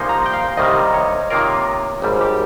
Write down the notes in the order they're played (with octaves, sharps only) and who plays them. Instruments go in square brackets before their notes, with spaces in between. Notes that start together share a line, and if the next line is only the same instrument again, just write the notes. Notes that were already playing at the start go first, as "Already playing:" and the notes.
Already playing: [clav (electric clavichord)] C2 A#2 F3 A#3 D#4 [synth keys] C6
[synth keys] A#5
G5
F5
[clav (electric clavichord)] C2 C3 D#3 G3 [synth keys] D#5
[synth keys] C#5
[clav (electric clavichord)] C3 D#3 A#3 F4 A#4
G#1 G#2 G3
[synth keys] G4